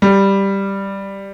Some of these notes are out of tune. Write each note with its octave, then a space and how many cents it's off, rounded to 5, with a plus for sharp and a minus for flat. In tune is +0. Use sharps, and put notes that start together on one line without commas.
G3 +5